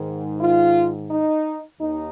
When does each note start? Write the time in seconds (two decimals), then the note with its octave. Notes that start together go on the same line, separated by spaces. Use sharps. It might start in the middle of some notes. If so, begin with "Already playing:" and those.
Already playing: G#2 D#3
0.41 F4
1.10 D#4
1.80 D#2 D#4